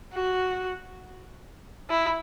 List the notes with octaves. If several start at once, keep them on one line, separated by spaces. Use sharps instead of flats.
F#4
E4